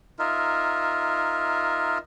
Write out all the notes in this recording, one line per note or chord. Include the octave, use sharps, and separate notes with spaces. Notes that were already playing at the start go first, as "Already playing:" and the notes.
D#4 F4 A#4 E5